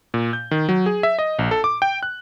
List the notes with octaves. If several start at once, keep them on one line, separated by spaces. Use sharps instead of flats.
A#2
G6
D#3
F#3
G#4
E5
D#5
A#1
A4
D6
G5
F#6